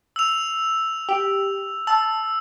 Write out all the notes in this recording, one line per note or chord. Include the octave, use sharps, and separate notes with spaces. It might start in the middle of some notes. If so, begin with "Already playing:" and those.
E6 F7
G4
A5 E6